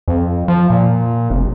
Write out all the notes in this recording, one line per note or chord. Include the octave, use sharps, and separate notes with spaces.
F2
F3
A#2
F1